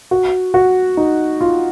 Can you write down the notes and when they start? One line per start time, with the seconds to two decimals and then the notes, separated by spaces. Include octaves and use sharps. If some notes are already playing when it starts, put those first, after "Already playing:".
0.11 F#4
0.54 F#4
0.97 D#4
1.41 F4